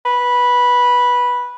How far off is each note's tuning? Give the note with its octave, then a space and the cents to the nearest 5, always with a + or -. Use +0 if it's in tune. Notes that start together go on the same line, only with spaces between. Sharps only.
B4 -10